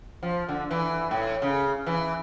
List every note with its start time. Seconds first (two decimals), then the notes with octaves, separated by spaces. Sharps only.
0.23 F3
0.49 D3
0.71 E3
1.11 A2
1.42 C#3
1.86 E3